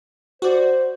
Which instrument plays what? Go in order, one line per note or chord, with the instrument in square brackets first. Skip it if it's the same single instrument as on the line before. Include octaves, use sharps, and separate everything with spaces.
[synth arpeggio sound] F#4 D5 [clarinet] C5